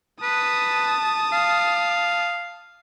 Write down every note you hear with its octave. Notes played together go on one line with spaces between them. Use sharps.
B4 A5 D#6
F5